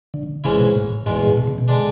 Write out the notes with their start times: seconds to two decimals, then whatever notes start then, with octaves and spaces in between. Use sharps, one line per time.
0.14 D3
0.44 G#2 C#3 E3 G#3 C#4 E4
0.59 B2
0.75 A2
1.06 E2 G#2 B2 G#3
1.16 A2
1.27 A2
1.37 B2
1.47 C#3
1.58 B2
1.68 D3 G#3 D4